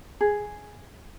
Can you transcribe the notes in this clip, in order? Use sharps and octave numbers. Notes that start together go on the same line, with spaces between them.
G#4